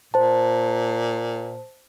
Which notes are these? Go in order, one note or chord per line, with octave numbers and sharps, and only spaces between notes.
A#2 C5 A5